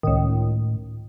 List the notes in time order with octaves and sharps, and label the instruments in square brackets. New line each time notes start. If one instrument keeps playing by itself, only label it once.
[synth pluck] C#2 D#3 [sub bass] A2